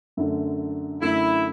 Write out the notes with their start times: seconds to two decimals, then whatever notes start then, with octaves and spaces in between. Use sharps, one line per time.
0.17 F#2 D3 A3
1.01 F#2 D3 A3 E4